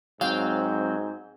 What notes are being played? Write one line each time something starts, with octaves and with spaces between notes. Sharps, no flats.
G#2 F#3 C4 F5 G5